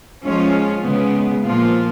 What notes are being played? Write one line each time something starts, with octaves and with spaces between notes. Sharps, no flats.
F3 G#3 C#4 F4
C#3 G#3 B3
A#2 F3 A#3 F4